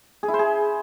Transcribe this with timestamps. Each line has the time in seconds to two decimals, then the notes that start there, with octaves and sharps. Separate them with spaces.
0.23 G#4
0.28 E4
0.34 C5
0.39 G#4